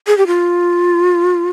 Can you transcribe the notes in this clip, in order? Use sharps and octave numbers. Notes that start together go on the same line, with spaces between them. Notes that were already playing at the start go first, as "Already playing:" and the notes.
G#4
G4
F4